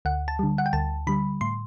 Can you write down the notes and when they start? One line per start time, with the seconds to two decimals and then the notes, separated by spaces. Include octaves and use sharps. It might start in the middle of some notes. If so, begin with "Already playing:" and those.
0.05 D2 F#5
0.28 A5
0.39 D3 G3
0.58 F#5
0.66 G5
0.73 D2 A5
1.07 D3 G3 B5
1.41 A2 C6